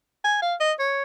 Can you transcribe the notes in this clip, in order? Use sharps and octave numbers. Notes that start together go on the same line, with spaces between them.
G#5
F5
D#5
C#5